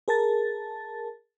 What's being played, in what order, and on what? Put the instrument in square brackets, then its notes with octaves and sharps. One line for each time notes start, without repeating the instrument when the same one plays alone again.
[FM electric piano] G#4 A#4 A5 A6